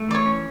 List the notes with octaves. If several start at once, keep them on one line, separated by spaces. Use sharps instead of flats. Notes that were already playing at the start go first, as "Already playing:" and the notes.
Already playing: A3
E3 D5
C#5
C#4